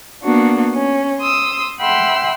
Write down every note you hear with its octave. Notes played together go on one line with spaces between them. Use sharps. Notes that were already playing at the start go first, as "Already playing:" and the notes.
A#3 B3 D4 F#4
C#4
C6 D#6 E6
E5 F#5 G5 B5 C6 E6